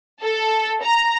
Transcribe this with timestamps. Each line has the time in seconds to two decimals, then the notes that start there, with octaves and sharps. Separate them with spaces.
0.21 A4
0.82 A#5